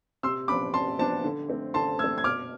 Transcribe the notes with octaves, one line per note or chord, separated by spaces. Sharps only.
C3 C6 E6
F3 B3 D4 B5 D6
C3 A5 C6
F3 B3 D4 A5
D3
A3 C4
D3 A5 C6
A3 C4 E6 G#6
G#6
B2 D6 F6